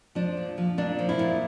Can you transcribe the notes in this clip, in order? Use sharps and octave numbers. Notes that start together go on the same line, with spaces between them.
F3 D4
A#2
F3
A#2 D4
F3
E4
A#2